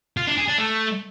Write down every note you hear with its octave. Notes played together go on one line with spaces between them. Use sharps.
F4
D4
G#4
D4
A3